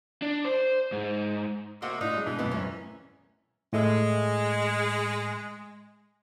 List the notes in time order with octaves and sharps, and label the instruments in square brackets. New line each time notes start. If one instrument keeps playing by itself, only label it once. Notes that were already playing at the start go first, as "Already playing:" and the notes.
[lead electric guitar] D4
C5
G#2
[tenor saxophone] C3 [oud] A#3 F#4 D#5
[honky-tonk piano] A2 [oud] D4 [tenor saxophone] D#4
[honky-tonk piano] G#3 E4
[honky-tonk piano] B2 [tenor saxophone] E3
[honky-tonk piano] C#2 F#2 [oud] B2 A3 B3
[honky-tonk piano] A1 F#2 [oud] C#4
[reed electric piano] A2 A3 E5 [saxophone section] G#3